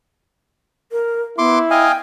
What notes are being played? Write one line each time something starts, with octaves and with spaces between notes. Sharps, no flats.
A#4
B3 E4 C6 D6
D#5 F5 G5 G#5